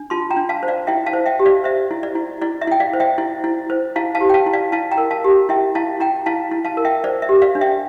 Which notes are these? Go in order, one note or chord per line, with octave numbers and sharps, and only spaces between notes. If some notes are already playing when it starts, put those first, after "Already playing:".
Already playing: D4
F4 A5 C6
G5 A#5
D4
F5 A5
C5
D5 F5
E4 E5 G5
F5 A5
C5
E5 G5
G4
D5 F5
C5 E5
E4
D5
E4
E4 D5
E5
E4 G5
D5 F5
C5
E5 G5
E4
E4
C5
E4 F5 A5
F5 A5
G4
G5
F5 A5
E4
D5 F5
E4 F5 A5
G5 A#5
A#4
F5 A5
G4
E4 E5 G5
E4 F5 A5
E4 G5 A#5
E4 F5 A5
E4
F5 A5
A#4
E5 G5
C5 D5
E5
G4
D5 F5
D4
E5 G5